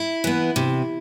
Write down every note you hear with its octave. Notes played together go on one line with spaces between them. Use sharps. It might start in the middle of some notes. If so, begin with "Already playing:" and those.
Already playing: E4
E3 B3
C3